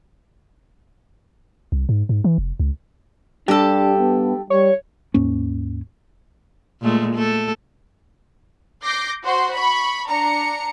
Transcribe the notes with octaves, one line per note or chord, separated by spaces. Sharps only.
C2
G#2
G#2
E3
F1
C#2
G2 D4 G4 A4
B3
G3 C#5
D#2 G#2 A#3 C#4
A#2 G#3 A3
A3 A4
D6 G6 A#6 C7
F#4 C5 C6
B5 C#6
D4 A#5 C#7